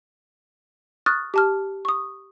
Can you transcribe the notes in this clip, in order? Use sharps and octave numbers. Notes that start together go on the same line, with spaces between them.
C#6 D#6 F6 F#6 A6
G4 A5 F6
C#6 D#6